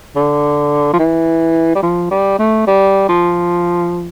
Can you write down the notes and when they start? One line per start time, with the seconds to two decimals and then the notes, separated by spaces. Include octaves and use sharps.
0.16 D3
0.93 F3
0.99 E3
1.75 G3
1.83 F3
2.11 G3
2.39 A3
2.67 G3
3.09 F3